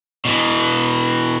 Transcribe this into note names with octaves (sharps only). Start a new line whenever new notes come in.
B2 E3